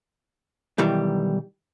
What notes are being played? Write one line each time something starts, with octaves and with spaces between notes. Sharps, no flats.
B1 D#3 E3 G3